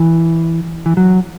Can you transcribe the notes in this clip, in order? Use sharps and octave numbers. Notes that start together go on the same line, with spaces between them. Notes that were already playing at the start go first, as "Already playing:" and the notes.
Already playing: E3
E3
F#3